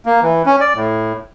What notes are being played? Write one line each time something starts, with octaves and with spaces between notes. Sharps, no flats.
A#3
E3
C#4
D5
A2